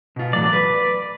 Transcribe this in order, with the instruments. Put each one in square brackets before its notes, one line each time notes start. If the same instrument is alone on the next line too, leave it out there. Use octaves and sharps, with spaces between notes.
[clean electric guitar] B2 F4
[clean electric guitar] E2 A2 F#3 [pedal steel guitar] D5
[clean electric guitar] B4